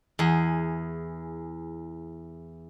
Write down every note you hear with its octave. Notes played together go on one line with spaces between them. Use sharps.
E2 G#4